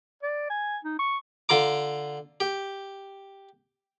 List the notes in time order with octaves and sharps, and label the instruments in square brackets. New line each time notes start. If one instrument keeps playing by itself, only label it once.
[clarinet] D5
G#5
D#4
C#6
[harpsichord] D3 F4 A#5 D6
G4